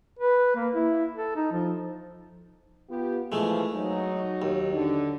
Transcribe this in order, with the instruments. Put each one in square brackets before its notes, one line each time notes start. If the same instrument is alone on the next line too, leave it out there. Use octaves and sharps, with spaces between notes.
[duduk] B4
A#3
E4
A4
D#4
F3
[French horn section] B3 F4 G4
[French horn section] E3 F3 [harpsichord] G#3 A3
[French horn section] F#3 D#4
[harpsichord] D#2
[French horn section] D3